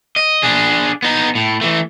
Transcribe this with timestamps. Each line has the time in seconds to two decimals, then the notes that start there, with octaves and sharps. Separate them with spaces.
0.16 D#5
0.43 D4 G#4
1.02 B3 D#4
1.35 A2
1.61 E3 A3